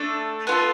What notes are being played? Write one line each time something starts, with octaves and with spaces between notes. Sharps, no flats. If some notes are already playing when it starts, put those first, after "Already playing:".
Already playing: A3 D4 A4
B3 F4 A4